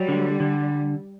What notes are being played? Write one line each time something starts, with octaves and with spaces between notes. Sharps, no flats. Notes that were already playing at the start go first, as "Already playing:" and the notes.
Already playing: F#3 G3
D3
D3